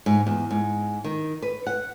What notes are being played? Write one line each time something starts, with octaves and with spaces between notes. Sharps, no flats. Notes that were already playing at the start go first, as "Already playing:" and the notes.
G#2
E2
G#2
D#3
B4
F#5